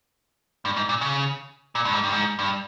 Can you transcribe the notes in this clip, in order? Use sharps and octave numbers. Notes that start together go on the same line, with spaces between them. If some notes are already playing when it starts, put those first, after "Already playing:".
G2
G#2
A#2
C#3
A#2
G2
G#2
G2
G#2
G2